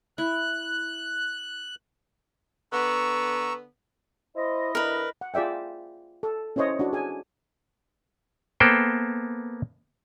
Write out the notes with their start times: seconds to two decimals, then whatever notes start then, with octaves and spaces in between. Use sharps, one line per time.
0.18 E4 F#6
2.73 D3 B3 A#5 C#6 E6
4.36 E4 C5 D#5
4.75 D3 A#4 B4
5.21 F#5
5.34 F4 G#4 D5 E5 G5
6.23 A4
6.56 C#4 E4 C5 C#5 D#5
6.79 D4 F#4
6.93 G#4 G#5
8.60 A#3 B3 A4 C5 G5